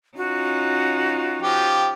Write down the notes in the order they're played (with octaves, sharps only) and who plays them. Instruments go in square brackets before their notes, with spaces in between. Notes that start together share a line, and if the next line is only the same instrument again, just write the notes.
[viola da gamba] C#4 D#4 F4 [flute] F#4
[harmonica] F3 G4